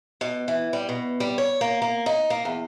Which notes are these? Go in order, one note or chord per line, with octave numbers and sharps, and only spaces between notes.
B2
E3
G3
B2
G3
C#5
A#3
A#3
D#4
A#3
E2